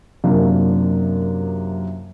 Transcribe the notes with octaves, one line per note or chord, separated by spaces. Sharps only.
F#2 C3 A#3 D4 F4